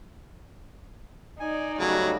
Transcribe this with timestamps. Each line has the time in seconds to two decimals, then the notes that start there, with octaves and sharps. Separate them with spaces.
1.40 D#4 D5 G#5
1.78 C#3 F#3 G3 A3